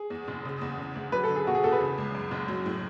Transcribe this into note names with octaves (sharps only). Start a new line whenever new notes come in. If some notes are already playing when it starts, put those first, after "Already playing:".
Already playing: G#4
E2
F#1
C#3
E2
C#3
D2
F#3 B4
A4
D3
G#4
B2 F#4
G#4
E2 A4
B4
C#3
C#2
F#2
F#1
F#3
A2